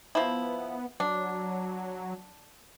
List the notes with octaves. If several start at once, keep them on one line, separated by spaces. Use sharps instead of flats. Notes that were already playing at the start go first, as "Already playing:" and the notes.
F3 B3 E4
F#3 D4